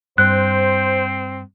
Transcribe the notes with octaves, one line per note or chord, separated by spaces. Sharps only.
G2 C4 C5 F#6